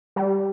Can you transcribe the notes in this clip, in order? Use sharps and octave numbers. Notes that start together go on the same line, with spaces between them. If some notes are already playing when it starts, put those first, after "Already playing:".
G3